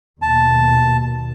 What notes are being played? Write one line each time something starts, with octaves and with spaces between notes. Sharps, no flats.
D#2 B2 A5